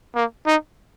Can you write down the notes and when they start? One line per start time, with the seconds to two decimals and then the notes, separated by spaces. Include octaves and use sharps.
0.15 A#3
0.47 D#4